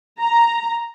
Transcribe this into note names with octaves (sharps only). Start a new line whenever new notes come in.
A#5